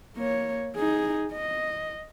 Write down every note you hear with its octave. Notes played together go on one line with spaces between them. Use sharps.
A#3 C#5
D#4 G#4
D#5